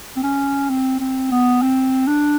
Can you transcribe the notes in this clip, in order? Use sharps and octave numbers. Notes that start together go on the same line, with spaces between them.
C4
C#4
C4
C4
B3
C4
D4